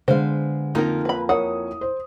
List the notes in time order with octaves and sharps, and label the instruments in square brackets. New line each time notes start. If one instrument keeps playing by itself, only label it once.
[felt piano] D3 [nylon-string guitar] G#3 B3 F5 [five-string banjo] C5
[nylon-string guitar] F2 A#3 F4 [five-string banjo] D#4 A#4
[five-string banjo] B4 B5
[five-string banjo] E4 F#5 [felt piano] A#4 C#5 D#6
[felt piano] C5